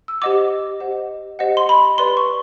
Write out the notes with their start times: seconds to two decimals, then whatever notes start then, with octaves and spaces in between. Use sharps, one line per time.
0.08 E6
0.22 G4 C5 D#5 F#5 D6
0.80 G4 C5 D#5 F#5
1.39 G4 C5 D#5 F#5
1.57 C6
1.69 B5
1.98 G4 B4 D5 C6
2.17 C#6